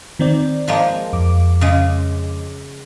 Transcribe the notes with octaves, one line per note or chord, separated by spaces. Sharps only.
D#3 C4 D5
F3 G#3 A#3
F2 D6
C#3 G#3